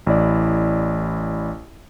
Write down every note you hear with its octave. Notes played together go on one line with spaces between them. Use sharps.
A1 E4 D5